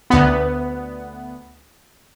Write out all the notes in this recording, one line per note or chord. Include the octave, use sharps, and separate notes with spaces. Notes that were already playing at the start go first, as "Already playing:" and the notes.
D2 B3